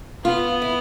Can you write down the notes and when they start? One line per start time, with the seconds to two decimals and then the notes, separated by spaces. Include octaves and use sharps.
0.25 B3 F4
0.62 E4